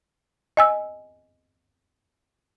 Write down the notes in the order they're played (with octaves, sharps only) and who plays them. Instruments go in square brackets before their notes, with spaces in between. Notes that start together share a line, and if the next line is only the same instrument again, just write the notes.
[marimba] D#5 G#5 E6